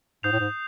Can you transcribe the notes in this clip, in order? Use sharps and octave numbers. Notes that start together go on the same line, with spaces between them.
G#2 D#6 G6 C7 F7
A2
G#2